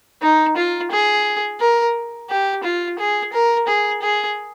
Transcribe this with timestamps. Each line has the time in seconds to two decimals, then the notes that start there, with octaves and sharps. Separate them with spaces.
0.22 D#4
0.57 F4
0.91 G#4
1.60 A#4
2.29 G4
2.64 F4
2.99 G#4
3.33 A#4
3.67 G#4
4.02 G#4